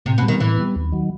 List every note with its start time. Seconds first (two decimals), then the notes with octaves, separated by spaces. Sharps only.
0.06 A2 C3
0.18 B2
0.23 G3 B3
0.28 D#3
0.40 A2 E3
0.57 G3 B3
0.76 D#2
0.92 D#3 F#3